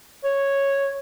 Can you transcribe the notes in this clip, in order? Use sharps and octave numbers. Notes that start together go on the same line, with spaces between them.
C#5